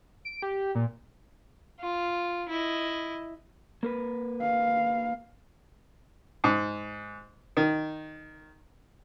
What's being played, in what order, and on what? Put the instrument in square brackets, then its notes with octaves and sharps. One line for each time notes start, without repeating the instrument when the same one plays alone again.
[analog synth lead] D7
G4
A#2
[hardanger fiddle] F4
E4 D#5
[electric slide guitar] A#3 A#4 B4
[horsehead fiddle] F5
[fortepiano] G#2
D#3